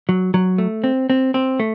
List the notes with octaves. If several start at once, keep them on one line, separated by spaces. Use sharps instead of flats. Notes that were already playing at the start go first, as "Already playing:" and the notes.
F#3
F#3
A3
C4
C4
C4
A3